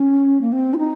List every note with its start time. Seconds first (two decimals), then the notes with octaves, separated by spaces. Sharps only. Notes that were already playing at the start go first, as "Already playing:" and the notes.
Already playing: C#4
0.41 A#3
0.52 C4
0.74 F4
0.78 D#4